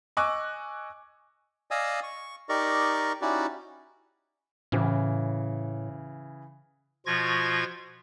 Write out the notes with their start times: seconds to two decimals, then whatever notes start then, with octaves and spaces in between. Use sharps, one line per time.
0.17 D#5 G#5 C#6 D6 E6 F#6
1.71 D5 D#5 F5 G#5 D#6 E6
2.03 C#6
2.49 D#4 G4 A#4 D5 D#5 C#6
3.21 C#4 D#4 E4 F#4 G4 D5
4.72 A2 C#3 E3
7.06 B2 F3 F4 C#6 G#6 A#6